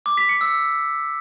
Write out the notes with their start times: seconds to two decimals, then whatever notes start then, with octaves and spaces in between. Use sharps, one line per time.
0.06 D6
0.17 B6
0.29 C#7
0.41 E6